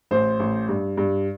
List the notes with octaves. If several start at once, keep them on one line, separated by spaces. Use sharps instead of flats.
A1 C5
A1
G2
G2